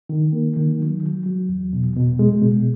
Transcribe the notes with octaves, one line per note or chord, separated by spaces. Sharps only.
D#3
A#3
D#3
F#3
F#3
F#3
E2
B2
B2
G#3
B2